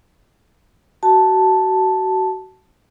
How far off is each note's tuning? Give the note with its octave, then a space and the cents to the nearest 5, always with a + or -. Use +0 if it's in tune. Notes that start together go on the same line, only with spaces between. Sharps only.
F#4 +30 A5 +0